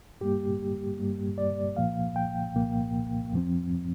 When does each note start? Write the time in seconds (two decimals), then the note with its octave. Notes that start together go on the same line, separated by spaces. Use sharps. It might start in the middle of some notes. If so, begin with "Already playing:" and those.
0.21 G2 G3 A#3 G4
0.99 G2 G3 A#3
1.38 D5
1.77 C2 A#2 F3 A#3 F5
2.16 G5
2.55 C2 A#2 F3 A#3
3.33 F2 F3 C4